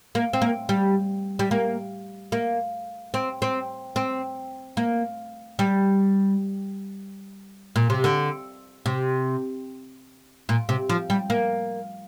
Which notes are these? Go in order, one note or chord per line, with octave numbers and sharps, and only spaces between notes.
A#3
C4
A#3
G3
G3
A#3
A#3
C4
C4
C4
A#3
G3
A#2
C3
D3
C3
A#2
C3
F3
G3
A#3